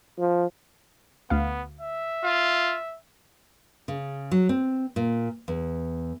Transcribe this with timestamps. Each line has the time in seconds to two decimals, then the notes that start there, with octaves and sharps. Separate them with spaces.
0.19 F3
1.30 D2 B3 F5
1.81 E5
2.24 F4
3.88 C#3
4.31 F#3
4.49 C4
4.96 A#2
5.48 E2